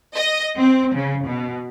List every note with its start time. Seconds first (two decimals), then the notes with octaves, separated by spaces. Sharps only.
0.15 D#5
0.58 C4
0.95 C#3
1.25 B2